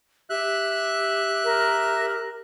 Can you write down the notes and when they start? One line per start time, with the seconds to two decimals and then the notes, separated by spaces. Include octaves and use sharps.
0.30 G4 E5 F#6
1.44 A#4